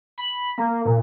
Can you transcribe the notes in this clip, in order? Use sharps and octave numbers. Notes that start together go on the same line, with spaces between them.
B5
A#3
A#2